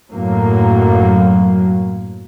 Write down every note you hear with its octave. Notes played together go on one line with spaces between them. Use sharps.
F#2 A2 F#3 A#3